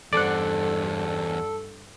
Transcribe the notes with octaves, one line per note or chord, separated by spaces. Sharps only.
E2 G2 A4 C5 D5 F#5